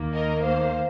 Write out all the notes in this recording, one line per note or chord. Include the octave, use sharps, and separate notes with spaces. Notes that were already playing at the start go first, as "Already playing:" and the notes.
Already playing: D#2 D#3 A#3
A#4 D#5
C5 F5